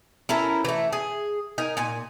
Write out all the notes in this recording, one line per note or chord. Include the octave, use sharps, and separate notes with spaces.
C#4 E4 A4 A#4
E3 A3
G#4
D#4 A#4 G#5
A#2 G#5